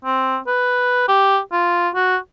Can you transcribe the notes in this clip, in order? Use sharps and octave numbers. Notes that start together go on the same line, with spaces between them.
C4
B4
G4
F4
F#4